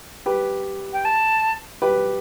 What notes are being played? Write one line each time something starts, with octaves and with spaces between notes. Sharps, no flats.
G4 B4
G5
A5
G4 B4